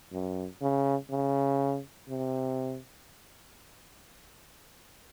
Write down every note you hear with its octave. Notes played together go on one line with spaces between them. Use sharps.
F#2
C#3
C#3
C3